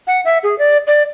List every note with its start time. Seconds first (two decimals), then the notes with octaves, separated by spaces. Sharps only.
0.07 F#5
0.25 E5
0.43 G#4
0.59 D5
0.87 D5